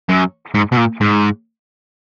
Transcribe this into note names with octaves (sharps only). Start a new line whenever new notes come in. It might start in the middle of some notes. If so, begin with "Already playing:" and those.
F#2
G#2
B2
A#2
G#2